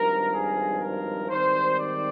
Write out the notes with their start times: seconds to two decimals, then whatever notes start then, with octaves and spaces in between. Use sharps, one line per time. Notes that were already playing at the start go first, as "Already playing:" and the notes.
Already playing: G#1 G2 F3 A#4
0.31 G#4
0.81 A#4
1.30 G#2 D#3 G3 C4 C5
1.79 D5